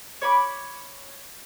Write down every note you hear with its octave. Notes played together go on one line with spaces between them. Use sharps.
C#5 B5 D6